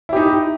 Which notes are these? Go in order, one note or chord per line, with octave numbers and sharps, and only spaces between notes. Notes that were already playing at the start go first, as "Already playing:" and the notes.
D#4 E4 G4